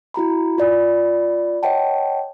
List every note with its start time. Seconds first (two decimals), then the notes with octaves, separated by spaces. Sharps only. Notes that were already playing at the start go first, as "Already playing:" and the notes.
0.14 E4 F#4 A#5 B5
0.58 F4 D5 B5
1.63 C#5 D#5 F#5 G5 A5